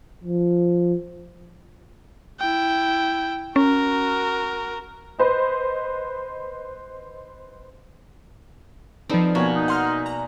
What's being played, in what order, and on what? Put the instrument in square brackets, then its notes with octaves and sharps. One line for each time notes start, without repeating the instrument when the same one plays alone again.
[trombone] F3
[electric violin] E4 G5
[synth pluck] C#4 [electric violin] F#4 A#4
[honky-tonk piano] B4 C5 D#5
[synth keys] F3 C4 [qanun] D#4 [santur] A4 B4 D5
[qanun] B2 [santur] A#3 G#5 [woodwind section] C#5
[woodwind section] D#4
[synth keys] F#5 C6 F6
A#5